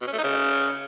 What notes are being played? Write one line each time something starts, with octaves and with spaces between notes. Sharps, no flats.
B2
C#4
A3
D#4
C#3